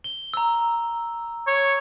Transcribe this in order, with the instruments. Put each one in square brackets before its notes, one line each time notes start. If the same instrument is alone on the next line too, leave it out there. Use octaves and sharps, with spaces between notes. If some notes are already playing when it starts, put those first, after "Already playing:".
[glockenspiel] G7
A#5 E6
[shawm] C#5